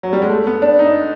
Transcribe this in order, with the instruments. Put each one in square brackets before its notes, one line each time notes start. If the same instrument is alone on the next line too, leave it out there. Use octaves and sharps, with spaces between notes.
[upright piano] F#3
G3
G#3
A3
B3
D4
D#4